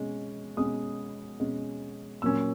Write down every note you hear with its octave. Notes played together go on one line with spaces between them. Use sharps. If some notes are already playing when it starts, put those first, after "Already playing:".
Already playing: B2 G#3 C#4
B2 G#3 C#4 D#6
B2 G#3 C#4
A#2 F#3 A#3 C#4 E6